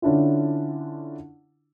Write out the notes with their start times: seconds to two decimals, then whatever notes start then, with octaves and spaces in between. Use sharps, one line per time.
0.02 D3 C#4 D4 E4 F4